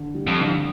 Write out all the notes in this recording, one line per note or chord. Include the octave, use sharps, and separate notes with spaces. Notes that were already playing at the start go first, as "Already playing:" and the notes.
Already playing: D3
G3
F2
D3